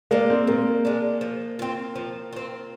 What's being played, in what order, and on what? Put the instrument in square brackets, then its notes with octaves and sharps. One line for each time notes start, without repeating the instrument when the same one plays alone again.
[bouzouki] G#3 D4 [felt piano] A#3
[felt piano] C4
[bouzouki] A#2 [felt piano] A#3
[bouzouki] G#3 D4
F3
C4 F4
F3
C4 F4